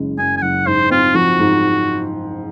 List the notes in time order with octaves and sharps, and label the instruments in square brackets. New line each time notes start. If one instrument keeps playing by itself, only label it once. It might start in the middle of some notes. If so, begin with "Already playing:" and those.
Already playing: [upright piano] F#1 C#3 G#3
[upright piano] F#2 [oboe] G#5
[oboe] G#5
[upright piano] F#1 [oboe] F#5
[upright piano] G#2 [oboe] C5
[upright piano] C4 [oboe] F4
[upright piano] F3 [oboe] F#4
[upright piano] G#2